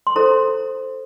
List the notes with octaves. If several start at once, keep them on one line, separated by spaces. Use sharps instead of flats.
C6
E4 A4 C5 A#5